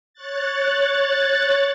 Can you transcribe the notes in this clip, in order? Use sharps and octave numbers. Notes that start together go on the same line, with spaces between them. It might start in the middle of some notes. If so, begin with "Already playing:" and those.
C#5 F#6 A6